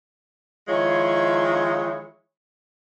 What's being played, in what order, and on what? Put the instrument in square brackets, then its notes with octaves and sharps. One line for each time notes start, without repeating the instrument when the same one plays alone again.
[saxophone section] D#3 F3 G#3 E4 G#4 C#5